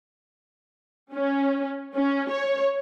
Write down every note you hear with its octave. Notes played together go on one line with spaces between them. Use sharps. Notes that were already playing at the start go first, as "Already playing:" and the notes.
C#4
C#4
C#5